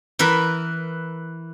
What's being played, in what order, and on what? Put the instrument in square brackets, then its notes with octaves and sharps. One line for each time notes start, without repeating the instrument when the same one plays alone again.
[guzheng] E3 E4 A#4 B4